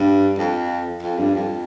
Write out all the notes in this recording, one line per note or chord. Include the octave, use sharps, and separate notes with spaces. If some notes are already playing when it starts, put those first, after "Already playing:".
Already playing: G2
F2
F2
G2
F2